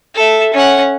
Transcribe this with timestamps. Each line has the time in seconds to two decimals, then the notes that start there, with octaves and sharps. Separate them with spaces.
0.15 A4 E5
0.54 C#4 F#5